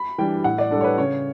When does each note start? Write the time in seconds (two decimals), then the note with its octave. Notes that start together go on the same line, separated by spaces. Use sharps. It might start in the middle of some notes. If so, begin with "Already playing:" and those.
Already playing: B5
0.18 E3 G3 D4 G5
0.44 A2 F#5
0.58 D5
0.71 G3 D4 A4
0.81 C#5
0.84 B4
0.98 C#3 C#5